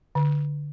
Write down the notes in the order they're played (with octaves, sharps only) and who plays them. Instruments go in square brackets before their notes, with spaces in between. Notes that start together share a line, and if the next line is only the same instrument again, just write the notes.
[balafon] D3